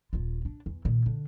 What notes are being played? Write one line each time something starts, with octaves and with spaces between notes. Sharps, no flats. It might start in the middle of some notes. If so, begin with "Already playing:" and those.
D#1 F4
D4
E2
A#2 D#3
D3